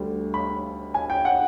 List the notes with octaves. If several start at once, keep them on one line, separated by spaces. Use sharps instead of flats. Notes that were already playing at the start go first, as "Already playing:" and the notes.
Already playing: D2 D3 G3
B5
G#5
G5
F#5